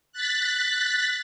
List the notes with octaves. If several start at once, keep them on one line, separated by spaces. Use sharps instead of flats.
F#6 A6 B6